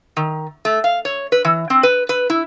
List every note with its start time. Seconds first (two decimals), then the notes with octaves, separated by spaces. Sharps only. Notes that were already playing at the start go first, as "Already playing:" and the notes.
0.17 D#3
0.65 A3
0.84 F5
1.05 C#5
1.32 B4
1.45 E3
1.70 C4
1.83 B4
2.09 B4
2.30 E4